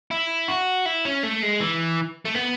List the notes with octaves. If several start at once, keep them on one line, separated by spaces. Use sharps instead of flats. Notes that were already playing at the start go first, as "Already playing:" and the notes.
E4
F#4
E4
C#4
A3
G#3
E3
A3
B3